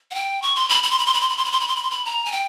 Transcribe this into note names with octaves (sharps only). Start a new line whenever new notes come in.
F#5
G5
C#6
C6
B5
B5
C6
B5
C6
B5
C6
B5
C6
B5
C6
B5
C6
B5
C6
B5
A#5
G#5
G5